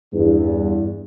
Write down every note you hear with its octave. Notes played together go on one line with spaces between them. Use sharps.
E2 G2